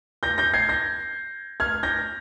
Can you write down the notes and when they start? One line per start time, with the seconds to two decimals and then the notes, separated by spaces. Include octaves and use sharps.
0.23 G6 A#6
0.38 G6 A#6
0.54 G#6 C7
0.69 G6 A#6
1.60 F6 G#6
1.83 G6 A#6